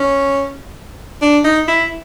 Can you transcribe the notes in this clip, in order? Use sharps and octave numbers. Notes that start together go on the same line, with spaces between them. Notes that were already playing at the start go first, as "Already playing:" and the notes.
Already playing: C#4
D4
D#4
E4